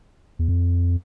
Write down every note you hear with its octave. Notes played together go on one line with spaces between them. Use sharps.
E2
F2